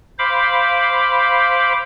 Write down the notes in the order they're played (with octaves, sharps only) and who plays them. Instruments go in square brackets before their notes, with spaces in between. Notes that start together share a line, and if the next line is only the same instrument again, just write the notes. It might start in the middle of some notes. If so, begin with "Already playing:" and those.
[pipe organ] C5 F5 B5 D6